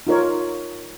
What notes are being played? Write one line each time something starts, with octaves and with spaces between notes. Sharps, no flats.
D#4 F4 A#4 C#5